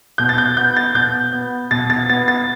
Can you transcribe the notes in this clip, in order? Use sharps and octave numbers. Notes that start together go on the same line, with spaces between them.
B2 G6
A6
G6
B3 G6
A6
B2 G6
B3
B2 A6
A6
B3 A6
A6